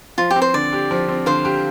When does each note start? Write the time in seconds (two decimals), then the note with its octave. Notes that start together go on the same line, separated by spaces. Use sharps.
0.18 F3 F4
0.30 G4
0.36 C4
0.42 C5
0.54 D3 D5
0.73 G4
0.91 F3
1.09 C4
1.26 D3 C5 F5
1.45 G4